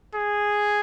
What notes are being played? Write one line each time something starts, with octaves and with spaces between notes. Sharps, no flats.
G#4